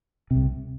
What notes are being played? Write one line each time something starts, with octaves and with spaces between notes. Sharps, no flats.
C2 C3